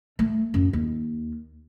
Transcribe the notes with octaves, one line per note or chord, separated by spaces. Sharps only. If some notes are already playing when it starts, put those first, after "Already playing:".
A3
F#2
D#2